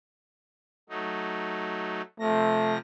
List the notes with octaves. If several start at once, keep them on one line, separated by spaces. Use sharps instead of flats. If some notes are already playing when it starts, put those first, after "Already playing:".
F#3 A3 D#4
C3 F3 A3 A#6